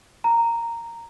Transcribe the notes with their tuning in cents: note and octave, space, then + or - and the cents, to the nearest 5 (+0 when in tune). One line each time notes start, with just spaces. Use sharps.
A#5 -10